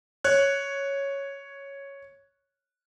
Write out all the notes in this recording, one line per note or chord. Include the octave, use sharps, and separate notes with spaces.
C#5 F#6